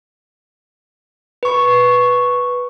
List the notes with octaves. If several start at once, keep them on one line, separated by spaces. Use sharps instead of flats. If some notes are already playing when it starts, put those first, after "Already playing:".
B4 C#6